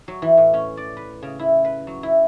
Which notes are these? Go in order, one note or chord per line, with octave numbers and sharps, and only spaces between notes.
F#3
E3
A2
C#4
D5
B4
C#3
E4
B4
F#3
E4